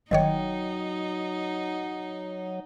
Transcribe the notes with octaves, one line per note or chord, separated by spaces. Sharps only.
G1 D#3 F#3 D#4 C#5 D#5 G5